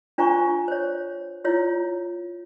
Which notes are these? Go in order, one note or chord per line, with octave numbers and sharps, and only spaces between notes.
D4 F4 C5 G#5 A#5 C#6
C5 C#5
E4 F4 C#5